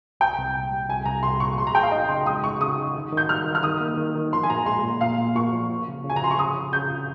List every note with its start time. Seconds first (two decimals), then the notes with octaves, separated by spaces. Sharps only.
0.20 C2 G5
0.38 C2
0.54 A#2
0.72 G3
0.89 C2 G#5
1.05 C2 A#5
1.23 C2 C6
1.40 A#2 C#6
1.58 G#4 C6
1.67 A#5
1.75 G#4 G5
1.83 F5
1.92 D#4 D#5
2.09 C#3 C6
2.26 G#3 D#6
2.43 G#3 C#6
2.61 C#3 D#6
2.78 D#4
2.95 D#3
3.12 D#3
3.17 G6
3.29 G3 F6
3.46 D#3
3.55 F6
3.63 D#3 D#6
3.81 A#3
3.98 D#3
4.16 D#3
4.33 F3 C6
4.43 G#5
4.50 A#2 A#5
4.66 G#3 C6
4.83 A#2
5.01 A#2 F5
5.18 A#2
5.35 A#2 C#6
5.53 F3
5.70 F4
5.87 C#3
6.04 C#3
6.10 G#5
6.16 A#5
6.22 F3 C6
6.31 C#6
6.38 C#3 D#6
6.56 C#3
6.73 C#3 G6
6.90 F4